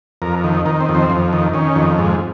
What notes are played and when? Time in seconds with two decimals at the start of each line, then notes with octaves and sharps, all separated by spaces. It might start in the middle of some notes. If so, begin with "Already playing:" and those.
0.22 F2 A#4
0.44 D#3
0.66 D#3 A#4
0.80 C4
0.89 F2
0.95 C4
1.10 F2
1.33 D#3
1.54 D#3 C#4
1.75 F2
1.98 G#2